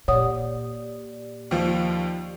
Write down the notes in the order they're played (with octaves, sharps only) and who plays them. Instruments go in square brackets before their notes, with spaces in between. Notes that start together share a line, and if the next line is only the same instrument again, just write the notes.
[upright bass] A#2 [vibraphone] G4 D5 [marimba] C#5 F#5 D#6
[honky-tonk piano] D#2 F3